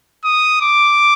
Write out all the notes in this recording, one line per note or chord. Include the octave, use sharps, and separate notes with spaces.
D#6
D6